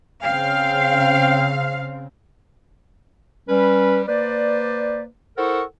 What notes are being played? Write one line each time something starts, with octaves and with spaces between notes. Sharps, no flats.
C#3 C4 F5 G5
G3 C#4 B4
A#3 B4 C5 D5
E4 A4 A#4 C5 F#5 C#6